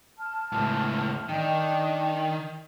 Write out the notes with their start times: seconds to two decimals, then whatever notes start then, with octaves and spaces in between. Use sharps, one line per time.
0.18 A5 F6
0.53 C#2 A2
1.29 D#3 D4 G5